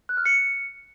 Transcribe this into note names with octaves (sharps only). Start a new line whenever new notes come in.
F#6
F6
C#7